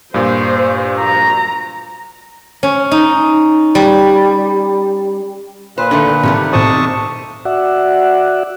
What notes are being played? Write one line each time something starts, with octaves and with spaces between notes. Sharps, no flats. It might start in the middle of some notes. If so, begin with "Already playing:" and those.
G2 A#2 C5
A#5
C#4
D#4
G3
A#2 B4 C5
D3 D#3 A3 C6 F#6
C3 D#3 G3 A3
B1 C4 A5 C#6 D#6
F#4 D5 E5 F#5